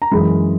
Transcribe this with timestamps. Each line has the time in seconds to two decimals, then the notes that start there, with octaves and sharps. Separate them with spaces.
0.02 A#5
0.11 F#2 E3 G#3 B5